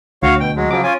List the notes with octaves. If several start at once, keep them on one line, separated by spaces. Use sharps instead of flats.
D2 F#4 C#5 F5
B2 G5
F#3 G#3
C#3 F3 F#3 D6
C#4 F4 G#5